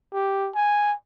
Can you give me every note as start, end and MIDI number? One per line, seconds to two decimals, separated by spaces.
0.13 0.50 67
0.55 0.93 80